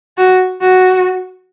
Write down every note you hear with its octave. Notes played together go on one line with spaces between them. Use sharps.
F#4
F#4